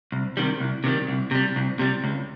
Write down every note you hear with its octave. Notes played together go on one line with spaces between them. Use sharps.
C2
C3 D#3 G3
C2
C3 D#3 G3
C2
C3 G3
C2
C3 G3
C#2